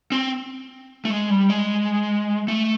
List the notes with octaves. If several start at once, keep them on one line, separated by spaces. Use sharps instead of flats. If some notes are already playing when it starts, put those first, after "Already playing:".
C4
A3
G#3
G3
G#3
A3